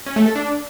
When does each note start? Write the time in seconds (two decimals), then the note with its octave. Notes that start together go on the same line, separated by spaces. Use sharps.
0.06 C#4
0.16 A3
0.26 A4
0.36 D4